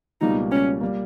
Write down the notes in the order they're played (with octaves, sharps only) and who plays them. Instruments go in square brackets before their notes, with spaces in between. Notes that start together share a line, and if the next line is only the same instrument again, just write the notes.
[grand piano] C#2 B2 G3 A#3 [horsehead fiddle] D#4
[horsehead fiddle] C#4
[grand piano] G3 A#3